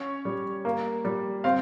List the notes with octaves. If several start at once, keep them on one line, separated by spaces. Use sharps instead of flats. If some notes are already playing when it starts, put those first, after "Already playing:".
Already playing: C#4 C#5
G3
A#3
G3
C4 F5